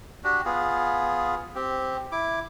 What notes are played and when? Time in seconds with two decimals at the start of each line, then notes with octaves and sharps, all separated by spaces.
0.24 D4 F#4 G4
0.45 B3 F4 G#4
1.55 C4 G4
2.12 E4 D6